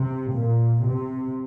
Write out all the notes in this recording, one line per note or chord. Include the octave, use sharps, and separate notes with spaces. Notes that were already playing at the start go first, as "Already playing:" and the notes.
Already playing: C3
A#2
C3